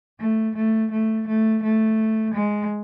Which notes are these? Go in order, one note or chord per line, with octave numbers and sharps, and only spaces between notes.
A3
A3
A3
A3
A3
G#3